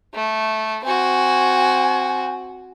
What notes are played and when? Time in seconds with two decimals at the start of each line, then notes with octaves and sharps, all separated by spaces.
0.14 A3
0.85 C4 F#4 G#5